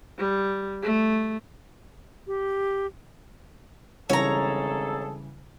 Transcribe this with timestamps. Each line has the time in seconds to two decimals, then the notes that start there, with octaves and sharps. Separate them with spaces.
0.18 G3
0.82 A3
2.27 G4
4.10 G#1 C#3 E3 G3 G#4 A4 C#5 A#5